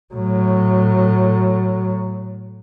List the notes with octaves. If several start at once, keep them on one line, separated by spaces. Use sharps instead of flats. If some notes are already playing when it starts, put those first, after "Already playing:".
A2 F#3